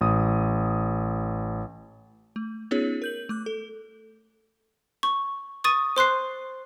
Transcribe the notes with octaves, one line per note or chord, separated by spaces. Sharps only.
A1 D#6
A3
B3 C#4 D#4 F4 G#4 C#5
A#4 G6 F#7
A3 D6 F#6
A4
C#6
C#6 D#6 A6 D#7
C5 C6 F#6 C7